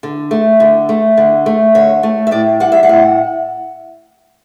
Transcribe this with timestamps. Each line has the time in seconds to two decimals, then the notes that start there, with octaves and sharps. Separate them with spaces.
0.03 D3
0.31 A3
0.60 D3
0.89 A3
1.17 D3
1.46 A3
1.75 D3 C#5
2.03 A3
2.27 E5
2.31 A2 D5
2.60 G3 F#5
2.72 E5
2.83 F#5
2.89 A2